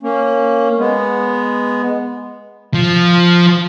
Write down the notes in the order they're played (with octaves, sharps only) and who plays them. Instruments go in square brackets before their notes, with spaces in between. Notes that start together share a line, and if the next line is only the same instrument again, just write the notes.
[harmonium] A#3 C#4
G#3 B3
[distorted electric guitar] F3